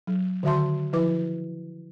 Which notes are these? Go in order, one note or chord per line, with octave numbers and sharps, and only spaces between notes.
F#3
D3 D#3 F#4 E5 A5 C6
F3 E4 B4 D6